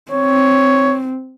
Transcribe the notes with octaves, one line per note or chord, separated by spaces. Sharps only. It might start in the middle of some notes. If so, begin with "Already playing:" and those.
C4 C#5